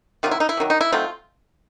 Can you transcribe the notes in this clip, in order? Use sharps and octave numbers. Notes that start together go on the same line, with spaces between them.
C3 D#3 F#3 F4
E4
D#4
E4
C3 D#3 F#3
D#4
E4
F#3 A3 C4 D#4 F4